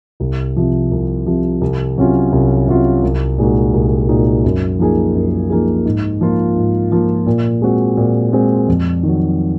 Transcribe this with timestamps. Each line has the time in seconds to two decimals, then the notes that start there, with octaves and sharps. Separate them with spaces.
0.20 C2
0.56 C3 F3
0.91 C2
1.26 C3 F3
1.61 C2
1.97 C3 F#3 C#4 F4
2.32 C2
2.68 C3 F#3 C#4 F4
3.03 C2
3.38 A#2 G#3 D#4 F#4
3.74 C2
4.09 A#2 G#3 D#4 F#4
4.45 F#2
4.79 F3 A#3 D#4 G#4
5.15 F#2
5.50 F3 A#3 D#4 G#4
5.86 G#2
6.21 F3 A#3 F4
6.56 G#2
6.92 F3 A#3 F4
7.27 A#2
7.62 G#3 C4 F#4
7.97 A#2
8.32 G#3 C4 F#4
8.68 F2
9.03 D#3 F#3